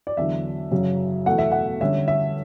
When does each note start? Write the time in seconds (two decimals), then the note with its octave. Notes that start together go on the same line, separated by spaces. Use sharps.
0.07 D5
0.17 E2 D3 F#3 E5
0.71 F#2 C#3 F#3 C#4
1.26 E2 B2 A3 F#5
1.38 E5
1.52 F#5
1.81 D3 G3 C#4 E5
2.08 E5